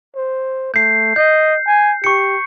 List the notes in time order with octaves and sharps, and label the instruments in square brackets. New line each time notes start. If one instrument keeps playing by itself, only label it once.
[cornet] C5
[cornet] A3 [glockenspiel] G6 C7
[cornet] D#5 [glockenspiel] G6
[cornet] G#5
[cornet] G4 [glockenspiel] C#6 C#7